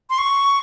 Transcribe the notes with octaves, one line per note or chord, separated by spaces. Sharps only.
C6
C#6